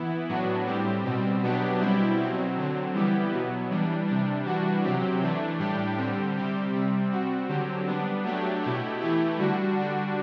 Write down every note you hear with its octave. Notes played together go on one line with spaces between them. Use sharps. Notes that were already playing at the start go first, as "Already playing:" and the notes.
Already playing: E3 B3 E4
A2 F#3 B3 D4 F#4
A2 G3 C4 G4
B2 G3 C4
B2 F#3 B3 D4 G4
B2 G3 C4 E4 G4
B2 F#3 C4
D3 F#3 C4
E3 G3 B3 E4 G4
B2 F#3 B3
E3 G3 D4
C3 G3 D4
E3 G3 D4 F#4
C3 F#3 C4 G4
E3 A3 D4
A2 G3 D4 G4
D3 G3 C4 G4
C3 G3 C4 G4
C3 G3 C4
G3 C4 F#4
D3 F#3 C4 G4
G3 B3 D4
F#3 A3 D4 G4
B2 A3 E4 G4
E3 A3 E4 G4
D3 G3 D4 F#4
D3 G3 D4 F#4